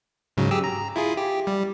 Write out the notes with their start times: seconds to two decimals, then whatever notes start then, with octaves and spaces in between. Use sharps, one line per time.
0.37 G#2 C#3 F#3
0.51 G4 G#4 E6
0.64 A#5
0.96 E4 F4 G#4
1.17 G4
1.47 G3